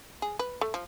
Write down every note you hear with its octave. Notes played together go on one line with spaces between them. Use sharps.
G#4
B4
A3
F3